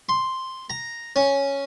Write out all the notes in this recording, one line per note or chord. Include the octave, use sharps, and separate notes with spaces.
C6
A#5
C#4